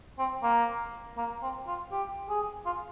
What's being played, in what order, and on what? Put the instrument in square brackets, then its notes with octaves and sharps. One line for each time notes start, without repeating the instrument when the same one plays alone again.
[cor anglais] C4
A#3
A#3
C4
F4
G4
G#4
F4